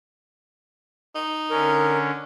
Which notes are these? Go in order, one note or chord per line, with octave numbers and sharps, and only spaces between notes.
D#4
D3 C#4 A#4